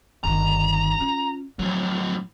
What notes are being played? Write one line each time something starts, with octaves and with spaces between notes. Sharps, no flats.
G1 D#3 A#5
C#4 F4
A2 F3 F#3